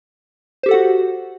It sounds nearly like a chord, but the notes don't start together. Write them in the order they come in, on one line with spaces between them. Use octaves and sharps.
C5 G4 A4 F#5 F#4